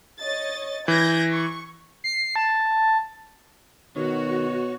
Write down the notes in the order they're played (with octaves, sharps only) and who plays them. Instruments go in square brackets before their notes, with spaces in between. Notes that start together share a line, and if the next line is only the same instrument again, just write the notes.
[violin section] C#5 D#5 A6
[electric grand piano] E3 [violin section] G6 G#6 A#6
[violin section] C#6
[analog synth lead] C7
A5
[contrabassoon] B2 [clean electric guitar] D#3 [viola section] F#4 [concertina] C#5